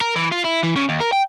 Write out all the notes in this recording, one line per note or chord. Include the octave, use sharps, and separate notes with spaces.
A#4
E3
F4
E4
E3
C#3
D#2
A#4
G5